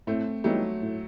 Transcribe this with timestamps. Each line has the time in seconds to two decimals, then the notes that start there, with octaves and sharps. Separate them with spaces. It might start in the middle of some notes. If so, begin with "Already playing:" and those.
0.07 A2 A3 C4
0.44 E3 F#3 G3 A3 B3 D#4
0.82 A2